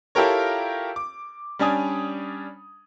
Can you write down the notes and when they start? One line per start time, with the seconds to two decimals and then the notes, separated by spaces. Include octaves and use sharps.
0.15 E4 F4 G4 A4 A#4 C#5
0.96 D6
1.59 G3 C#4 D4 G#5 D#6